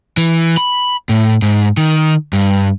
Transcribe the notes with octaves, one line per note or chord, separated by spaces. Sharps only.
E3
B5
A2
G#2
D#3
G2